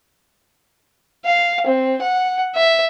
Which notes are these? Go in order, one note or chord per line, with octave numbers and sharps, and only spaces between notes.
F5
C4
F#5
E5